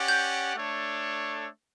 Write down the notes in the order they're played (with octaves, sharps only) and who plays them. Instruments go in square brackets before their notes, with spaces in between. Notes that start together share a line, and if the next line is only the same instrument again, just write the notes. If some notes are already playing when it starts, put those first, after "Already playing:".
Already playing: [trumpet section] C#4 G4 D5 F#5
[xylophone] G6
[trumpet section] A3 D4 A4 C#5